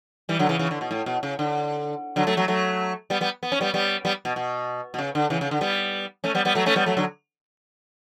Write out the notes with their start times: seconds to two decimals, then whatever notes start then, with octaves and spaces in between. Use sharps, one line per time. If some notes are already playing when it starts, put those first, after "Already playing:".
0.29 E3 G3
0.39 D3 F#3
0.49 C#3 E3
0.59 C#3 E3
0.71 D3
0.81 B2
0.91 A2
1.06 B2
1.23 C#3
1.39 D3
2.16 D3 F#3
2.27 F#3 A3
2.37 F#3 A3
2.48 F#3 A3
3.10 G3 B3
3.21 G3 B3
3.43 B3
3.52 C#4
3.61 G3 B3
3.74 G3 B3
4.05 G3 B3
4.25 B2
4.36 B2
4.94 B2
4.99 C#3
5.15 D3
5.30 C#3 E3
5.41 C#3
5.51 D3
5.61 G3 B3
6.24 A3 C#4
6.35 G3 B3
6.45 G3 B3
6.55 F#3 A3
6.66 A3 C#4
6.76 G3 B3
6.86 F#3 A3
6.97 D3 F#3